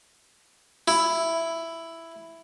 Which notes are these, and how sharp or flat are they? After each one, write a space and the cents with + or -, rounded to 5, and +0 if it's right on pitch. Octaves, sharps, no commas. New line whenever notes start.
E4 +5